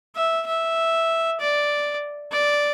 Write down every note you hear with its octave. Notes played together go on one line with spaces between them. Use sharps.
E5
E5
D5
D5